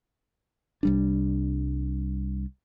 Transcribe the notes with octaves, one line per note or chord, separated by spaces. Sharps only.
C2 G3 D4